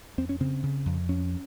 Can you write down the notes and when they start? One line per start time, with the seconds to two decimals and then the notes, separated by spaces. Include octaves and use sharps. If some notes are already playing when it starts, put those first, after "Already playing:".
0.18 F2 C4
0.29 C#4
0.40 C#3 C4
0.63 C#3
0.86 F2
1.09 F2 C#4